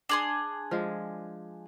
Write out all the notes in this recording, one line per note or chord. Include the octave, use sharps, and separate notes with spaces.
D4 G#4 C6
F3 G#3